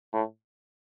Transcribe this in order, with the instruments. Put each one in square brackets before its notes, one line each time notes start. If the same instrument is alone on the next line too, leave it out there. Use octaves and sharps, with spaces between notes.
[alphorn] A2